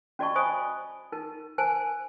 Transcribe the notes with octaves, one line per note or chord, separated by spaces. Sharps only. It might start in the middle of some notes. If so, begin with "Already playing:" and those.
C#4 F#4 D5 D#5 A5 C#6
C5 D#5 G#5 B5 D#6
D#4 A#4
A#4 C5 G#5 A5